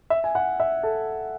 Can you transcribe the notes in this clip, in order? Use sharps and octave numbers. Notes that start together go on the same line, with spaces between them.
E5
G#5
F#5
E5
A4